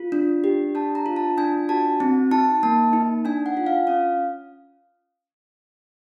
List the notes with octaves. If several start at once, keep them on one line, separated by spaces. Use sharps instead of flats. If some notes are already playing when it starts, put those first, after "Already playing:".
Already playing: F4
D4
G4
D4 A5
A#5
F4
A5
D4 G#5
F#4 A5
C4
D#4 A5
A#3 A5
D#4
D4 G#5
F#5
F4
F5
C#4 F5